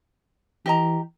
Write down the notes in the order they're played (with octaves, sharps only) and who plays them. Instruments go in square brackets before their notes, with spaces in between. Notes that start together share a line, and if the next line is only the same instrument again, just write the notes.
[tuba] E3 [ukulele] G4 D#5 A#5